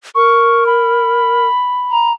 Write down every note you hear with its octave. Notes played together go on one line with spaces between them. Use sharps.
A#4 C#6
B5
A#5